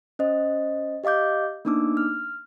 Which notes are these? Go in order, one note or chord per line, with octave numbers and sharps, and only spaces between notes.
C#4 C5 D#5
G4 D#5 F5 D6 G6
A#3 B3 D4 D#4 D6 E6
F6